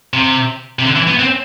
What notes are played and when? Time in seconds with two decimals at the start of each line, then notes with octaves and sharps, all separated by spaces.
0.14 C3
0.79 C3
0.84 D3
0.96 E3
1.08 B3
1.19 C4